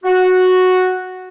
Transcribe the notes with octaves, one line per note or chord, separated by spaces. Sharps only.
F#4